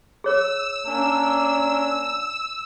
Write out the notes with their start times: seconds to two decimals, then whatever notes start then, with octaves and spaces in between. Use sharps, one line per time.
0.24 G#4 C#5 E6
0.86 A#3 C#4 D4